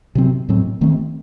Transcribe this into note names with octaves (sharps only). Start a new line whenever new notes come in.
C3 F#3 C4
A2 F#3 C4
D#3 A3 C4